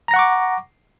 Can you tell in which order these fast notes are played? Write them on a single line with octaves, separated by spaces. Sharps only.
A#5 A#6 F#5 C#6 D6